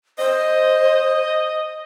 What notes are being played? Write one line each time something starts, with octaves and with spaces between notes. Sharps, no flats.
C5 D#5